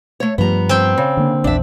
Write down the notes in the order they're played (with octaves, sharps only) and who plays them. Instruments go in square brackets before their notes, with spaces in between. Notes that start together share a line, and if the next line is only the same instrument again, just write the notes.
[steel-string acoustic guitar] A3 C#5
[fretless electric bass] G2 F3 G3 [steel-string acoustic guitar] B3 A#5
[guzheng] C4 G5
[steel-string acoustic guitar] C#3
[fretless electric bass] D3 A#3
[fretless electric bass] A#1 E2 [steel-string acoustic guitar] D4 E5